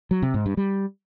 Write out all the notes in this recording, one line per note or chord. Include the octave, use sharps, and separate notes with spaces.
F#3
C3
G#2
G2
G3